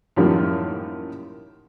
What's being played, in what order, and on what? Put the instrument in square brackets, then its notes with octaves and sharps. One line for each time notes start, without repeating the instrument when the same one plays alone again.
[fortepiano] F#2 A2 D#3 F3 G3 A#3